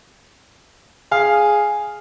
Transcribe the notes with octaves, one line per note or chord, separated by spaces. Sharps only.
G#4 F5